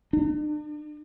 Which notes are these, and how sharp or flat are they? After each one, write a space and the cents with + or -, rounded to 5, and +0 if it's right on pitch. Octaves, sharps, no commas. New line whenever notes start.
D4 +40